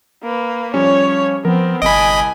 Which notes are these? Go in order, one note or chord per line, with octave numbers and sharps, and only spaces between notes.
A#3 B4
F3 G3 C#4 C#5
F3 B3 C4 A#4
G1 C2 D#5 G#5 B5 D7